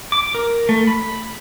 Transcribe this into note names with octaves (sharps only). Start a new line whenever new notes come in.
D6
A#4
A3
B5